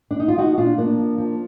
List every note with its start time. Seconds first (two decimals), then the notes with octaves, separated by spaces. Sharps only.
0.11 D4
0.20 D#4
0.28 F4
0.37 F3 D#4 F#4
0.58 A#2 D4 F4
0.78 F3 A#3 D4
0.98 F3
1.18 F3